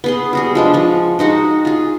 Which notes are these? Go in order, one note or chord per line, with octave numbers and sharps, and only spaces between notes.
B3 G#4 C6
G3 F#4 G#4
F3 G#3 D4
F3 C#6
G#3 D#4 F#4 F#5
F4 G#4